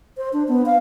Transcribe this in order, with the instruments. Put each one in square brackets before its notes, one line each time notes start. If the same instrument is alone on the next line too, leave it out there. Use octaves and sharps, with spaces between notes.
[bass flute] C5
D4
B3
F5